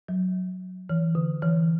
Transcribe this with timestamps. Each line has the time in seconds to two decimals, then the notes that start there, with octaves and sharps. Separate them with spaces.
0.08 F#3
0.89 E3
1.15 D3
1.42 E3